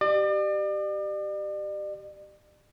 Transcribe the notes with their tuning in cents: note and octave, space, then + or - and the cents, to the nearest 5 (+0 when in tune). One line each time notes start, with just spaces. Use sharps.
G4 -15 D5 +40